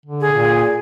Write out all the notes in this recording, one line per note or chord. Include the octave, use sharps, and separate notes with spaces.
D3
G#4
A#2